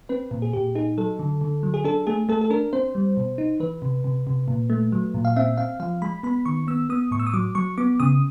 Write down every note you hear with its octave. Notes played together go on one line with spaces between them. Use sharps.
C4 B4
A#2
G#4
A#2 G4
D#4 G#4
F#3 A4
D3
D3
F#3
G#4
D4 A4
A3 G#4
A3 A4
A4
D4 A#4
C4 C5
G3
B2
D#4
E3 B4
C3
C3
C3
A#2
A3
F#3
A#2
F5
C4 E5
C4 F5
F3 F5
G#3 B5
B3 B5
D#3 C#6
B3 E6
B3 D#6
A2 C#6
E6
D#6
F#3 D6
F#3 C#6
B3 D6
C#3 D#6